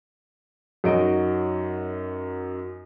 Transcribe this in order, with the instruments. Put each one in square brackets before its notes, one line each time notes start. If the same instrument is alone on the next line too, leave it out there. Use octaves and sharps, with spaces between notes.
[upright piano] F#2 D#4 F#4 D#5 D7